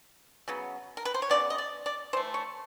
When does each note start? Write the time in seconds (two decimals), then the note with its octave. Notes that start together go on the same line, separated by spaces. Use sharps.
0.48 C#3 F#3 B3
0.97 A#4
1.05 B4
1.14 C5
1.22 C#5
1.30 C#3 F#3 B3 D5
1.50 D#5
1.58 D5
1.86 D5
2.13 E3 A3 C5
2.34 C#5